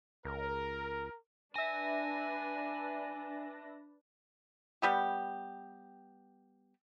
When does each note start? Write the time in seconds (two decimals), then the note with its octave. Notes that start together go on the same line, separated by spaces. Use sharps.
0.25 C#2 A#4
1.56 D4 B4 E5 G#5 A5 A#6
4.82 G3 B3 G4